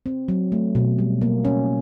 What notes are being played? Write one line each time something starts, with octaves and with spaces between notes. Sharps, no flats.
C4
F#3
A3
B2
G3
A#3
C#4